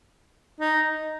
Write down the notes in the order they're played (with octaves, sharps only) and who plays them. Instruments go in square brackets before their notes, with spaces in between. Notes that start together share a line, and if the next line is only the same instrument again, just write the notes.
[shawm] D#4